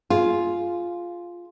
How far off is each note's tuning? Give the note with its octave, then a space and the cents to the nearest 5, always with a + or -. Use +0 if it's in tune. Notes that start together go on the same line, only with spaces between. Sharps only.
F4 +0 G#4 +15